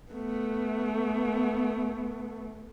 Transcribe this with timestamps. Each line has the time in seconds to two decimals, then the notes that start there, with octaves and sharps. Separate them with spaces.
0.12 A3 B3